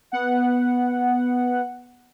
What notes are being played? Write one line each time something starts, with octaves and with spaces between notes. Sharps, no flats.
B3 F#5